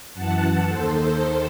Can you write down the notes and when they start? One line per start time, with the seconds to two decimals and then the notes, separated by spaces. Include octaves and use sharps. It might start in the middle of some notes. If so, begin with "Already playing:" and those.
0.14 F#2 E3 F#5 A5
0.68 D#2 D#3 A4 C5